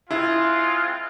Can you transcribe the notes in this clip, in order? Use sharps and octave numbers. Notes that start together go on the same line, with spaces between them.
G#3 C4 E4 F4